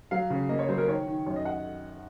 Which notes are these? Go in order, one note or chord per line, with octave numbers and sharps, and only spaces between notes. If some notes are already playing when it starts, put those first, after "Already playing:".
F#3 F5
C#3
A#3 D#5
C#5
F#3 C5
A#4
D#3 C#5
D#3
F#2 C#5
D#5
F#5